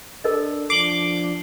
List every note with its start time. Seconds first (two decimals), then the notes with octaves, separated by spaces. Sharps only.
0.24 D4 A4 A#4 D#5
0.70 F3 D4 D6 C7 F#7 G7